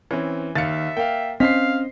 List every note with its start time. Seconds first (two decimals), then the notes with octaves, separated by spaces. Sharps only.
0.11 E3 C4 C#4
0.55 D#2 E5 F5 A6 C#7
0.97 A#3 F5 G5
1.40 C4 C#4 C5 D#5 F5 B6 C7